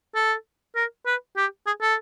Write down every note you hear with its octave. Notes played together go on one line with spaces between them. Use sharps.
A4
A#4
B4
G4
G#4
A4